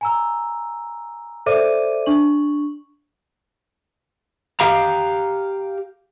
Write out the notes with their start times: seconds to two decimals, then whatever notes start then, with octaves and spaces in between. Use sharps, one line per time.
0.01 G#5 A#5 E6
1.46 A4 C5 D5 E5 D6 D#7
2.06 D4 C#6 F#7
4.60 G4 F5 A#5